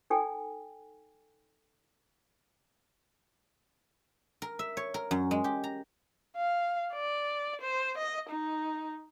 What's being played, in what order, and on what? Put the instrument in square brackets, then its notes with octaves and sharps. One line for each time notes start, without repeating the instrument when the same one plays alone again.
[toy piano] D#4 A4 G5 G#5
[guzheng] A#4
E5
C#5
A#4
F#2
G#3
G4
A#5
[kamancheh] F5
D5
C5
D#5
D#4